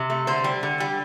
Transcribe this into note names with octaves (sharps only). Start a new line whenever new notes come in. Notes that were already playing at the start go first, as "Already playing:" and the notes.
Already playing: C3
A3
D3 C5
G3
D3
G3